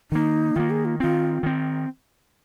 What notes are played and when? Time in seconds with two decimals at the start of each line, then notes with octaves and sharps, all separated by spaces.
0.11 D#3 A#3 D#4
0.56 D#3 A#3 F4
0.70 G#4
0.85 F4
1.00 D#3 C4 F4
1.43 D#3 C4